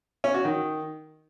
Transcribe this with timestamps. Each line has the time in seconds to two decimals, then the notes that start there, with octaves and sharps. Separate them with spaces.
0.24 C#4
0.34 F#4
0.45 D#3